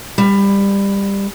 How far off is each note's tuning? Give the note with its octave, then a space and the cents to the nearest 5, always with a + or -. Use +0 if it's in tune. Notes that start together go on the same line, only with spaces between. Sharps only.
G3 +20